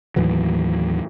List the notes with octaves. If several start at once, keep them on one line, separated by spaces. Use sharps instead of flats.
D#2 A2 E3 F#3